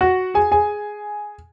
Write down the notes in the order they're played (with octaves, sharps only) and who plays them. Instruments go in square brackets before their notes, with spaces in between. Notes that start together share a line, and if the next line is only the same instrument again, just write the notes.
[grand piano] F#4 F#5
G#4 G#5
G#4 G#5